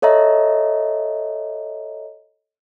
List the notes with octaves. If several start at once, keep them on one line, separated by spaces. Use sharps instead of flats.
A4 C#5 D#5 E5 A#5